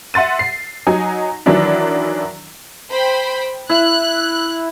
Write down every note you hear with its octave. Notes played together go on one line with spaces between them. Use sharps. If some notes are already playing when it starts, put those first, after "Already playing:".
E5 F#5 C6 A6 D#7
C7
F#3 D#4 G#5
D#3 E3 F#3 D4 E4
C5 G5 B5
E4 F#6